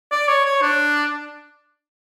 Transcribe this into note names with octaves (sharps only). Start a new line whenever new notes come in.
D5
C#5
C#5
D4